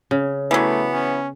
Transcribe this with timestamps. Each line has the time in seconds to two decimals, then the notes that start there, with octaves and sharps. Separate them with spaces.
0.11 C#3
0.51 E3 F#3 A3 B3
0.91 C#4